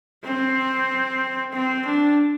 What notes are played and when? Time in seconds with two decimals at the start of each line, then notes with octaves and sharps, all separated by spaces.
0.24 C4
1.53 C4
1.86 D4